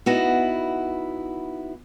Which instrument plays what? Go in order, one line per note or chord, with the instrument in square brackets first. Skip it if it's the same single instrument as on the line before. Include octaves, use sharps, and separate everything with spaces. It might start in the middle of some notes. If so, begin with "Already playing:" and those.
[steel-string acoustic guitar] B3 D#4 E4 F#4